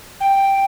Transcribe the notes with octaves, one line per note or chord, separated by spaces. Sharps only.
G5